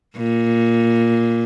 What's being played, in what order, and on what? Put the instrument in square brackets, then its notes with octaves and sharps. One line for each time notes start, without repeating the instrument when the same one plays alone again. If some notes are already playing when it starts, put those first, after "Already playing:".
[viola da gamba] A#2